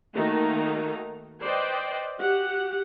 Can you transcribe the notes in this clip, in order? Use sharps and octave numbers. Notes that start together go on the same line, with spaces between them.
D#3 A3 A#3 D#4 F#4 A#5
B4 C5 D5 D#5 G5
F#4 G4 F#5